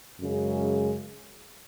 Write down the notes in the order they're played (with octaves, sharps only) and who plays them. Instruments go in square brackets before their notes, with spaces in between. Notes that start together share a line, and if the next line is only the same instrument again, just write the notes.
[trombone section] F#2 C#3 G#3